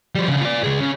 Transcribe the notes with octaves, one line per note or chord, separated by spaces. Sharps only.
F3 G3
C#3 D4
F4 D5
C#2 G#4
C#3